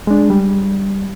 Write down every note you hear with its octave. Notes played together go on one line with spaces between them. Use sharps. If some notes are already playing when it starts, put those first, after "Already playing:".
G#3 D4
G3